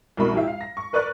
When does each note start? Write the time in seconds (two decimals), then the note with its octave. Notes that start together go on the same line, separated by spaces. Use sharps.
0.17 C2 B2 A#3 B5 C#6
0.33 F3 E4 G4 E5
0.47 F5
0.61 A#6
0.77 C#6
0.93 A#4 B4 D5 C#6 F#6